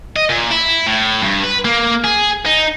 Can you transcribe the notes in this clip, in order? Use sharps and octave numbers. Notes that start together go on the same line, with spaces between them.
D#5
A#2
E4
A2
G2
B4
A#3
G#4
D#4